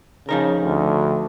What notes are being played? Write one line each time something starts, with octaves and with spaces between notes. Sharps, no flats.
C#3 F3 D#4 A#4
D2